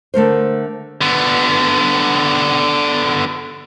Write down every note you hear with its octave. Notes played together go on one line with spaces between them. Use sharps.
D3 A3 A#4 C5
D3 B3